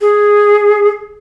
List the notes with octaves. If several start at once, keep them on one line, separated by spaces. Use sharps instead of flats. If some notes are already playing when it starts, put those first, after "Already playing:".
G#4